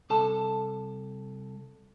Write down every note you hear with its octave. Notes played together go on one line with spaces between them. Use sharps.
C2 A4 A5